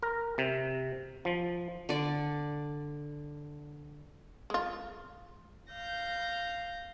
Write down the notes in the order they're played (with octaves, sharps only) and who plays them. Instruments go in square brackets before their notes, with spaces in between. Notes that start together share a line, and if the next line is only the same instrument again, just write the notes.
[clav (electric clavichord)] A#4
C3
F3
[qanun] D3 D5
[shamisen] G#3 F4
[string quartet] F5 G6 A#6